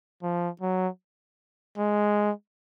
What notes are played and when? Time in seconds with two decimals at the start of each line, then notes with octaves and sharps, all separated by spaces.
0.23 F3
0.61 F#3
1.78 G#3